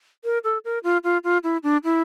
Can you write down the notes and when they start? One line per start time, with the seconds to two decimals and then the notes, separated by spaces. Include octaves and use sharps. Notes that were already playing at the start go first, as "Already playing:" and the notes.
0.24 A#4
0.44 A4
0.65 A#4
0.84 F4
1.04 F4
1.24 F4
1.44 E4
1.63 D4
1.84 E4